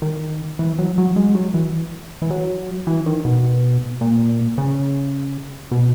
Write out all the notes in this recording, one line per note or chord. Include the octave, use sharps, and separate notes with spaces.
D#3
E3
F#3
F#3
G#3
F#3
E3
E3
F#3
E3
D#3
B2
A#2
C#3
B2